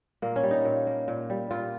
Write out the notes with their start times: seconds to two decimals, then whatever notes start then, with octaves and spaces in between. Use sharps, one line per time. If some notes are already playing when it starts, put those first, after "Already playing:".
0.22 A#2 A#3
0.36 C#4
0.43 G3
0.51 D#4
0.65 A#2
0.87 A#3
1.08 A#2
1.30 G3
1.51 A#2 F4